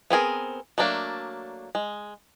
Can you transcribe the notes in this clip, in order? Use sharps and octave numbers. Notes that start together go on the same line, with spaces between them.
B3 C4 G#4 A#4
F#3 A3 A#3 D4
G#3